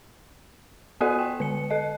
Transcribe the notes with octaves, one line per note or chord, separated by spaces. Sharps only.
B3 F#4 A4 D5 F#5
G5
D3 C#7
A4 D#5